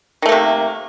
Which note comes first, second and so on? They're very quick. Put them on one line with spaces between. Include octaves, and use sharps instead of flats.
D#3 A3 A#3 C3